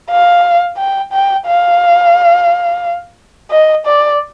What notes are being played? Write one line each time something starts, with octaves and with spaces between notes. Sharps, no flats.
F5
G5
G5
F5
D#5
D5